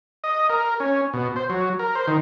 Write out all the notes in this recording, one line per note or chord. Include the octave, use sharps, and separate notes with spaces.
D#5
A#4
C#4
B2
C5
F#3
A#4
C5
D#3